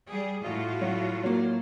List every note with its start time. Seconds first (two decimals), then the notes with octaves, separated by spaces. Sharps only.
0.10 G3 G#4
0.43 A2 F4 F#4
0.81 F#3
1.23 F#3 A#3